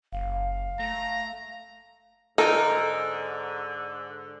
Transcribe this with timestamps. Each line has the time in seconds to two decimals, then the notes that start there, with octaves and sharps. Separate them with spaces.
0.13 F#1 F5
0.79 A3 A#5
2.38 G#2 D3 D#4 A4 A#4 G6